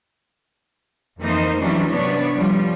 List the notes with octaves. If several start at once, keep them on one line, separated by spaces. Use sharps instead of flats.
F2 E3 A#3 D#4 C5 D#5
E3 F#3 G3 C#4 D4 E4
C3 B3 D4 C#5 D5
F3 G3